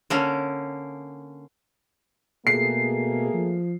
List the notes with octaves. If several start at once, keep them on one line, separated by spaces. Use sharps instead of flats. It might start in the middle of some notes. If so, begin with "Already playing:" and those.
D3 A#3 C#4
B2 A3 A#3 G#4 C7
F3